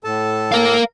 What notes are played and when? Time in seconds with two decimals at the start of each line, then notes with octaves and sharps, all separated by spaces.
0.04 A2 A4 A5
0.52 A#4 F5